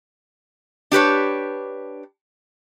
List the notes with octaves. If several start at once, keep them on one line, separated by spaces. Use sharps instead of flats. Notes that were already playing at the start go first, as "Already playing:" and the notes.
D4 G4 B4 C#5